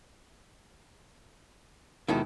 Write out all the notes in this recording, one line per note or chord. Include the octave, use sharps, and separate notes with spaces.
D#2 B2 D#3 G#3 E4 A4